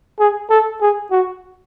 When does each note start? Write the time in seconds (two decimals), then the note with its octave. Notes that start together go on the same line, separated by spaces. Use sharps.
0.19 G#4
0.50 A4
0.81 G#4
1.11 F#4